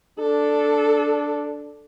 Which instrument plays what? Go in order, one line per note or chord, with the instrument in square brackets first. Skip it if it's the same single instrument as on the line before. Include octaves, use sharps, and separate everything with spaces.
[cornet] D4 [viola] A4